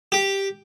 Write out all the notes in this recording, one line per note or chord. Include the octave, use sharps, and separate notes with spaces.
G4